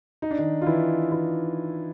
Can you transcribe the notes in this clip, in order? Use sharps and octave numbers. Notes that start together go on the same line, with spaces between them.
D#4
D4
D#3 D#4
F4
E3 E4
E3 E4